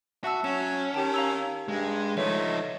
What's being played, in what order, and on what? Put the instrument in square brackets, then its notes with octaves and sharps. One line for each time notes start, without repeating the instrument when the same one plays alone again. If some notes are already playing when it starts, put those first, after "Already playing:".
[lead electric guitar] F#4 [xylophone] E5 A5 E6
[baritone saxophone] F#3 [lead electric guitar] C#4 [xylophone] E7
[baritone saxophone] D#3 [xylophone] G4 G5 A5
[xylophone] F5 A#5 E6
[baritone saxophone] G2 [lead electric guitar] G#3
[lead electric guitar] F3 D#4 [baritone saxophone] A3 [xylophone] B4 C#5 E5